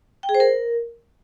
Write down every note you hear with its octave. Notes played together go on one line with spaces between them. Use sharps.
G5
G#4
C5
A#4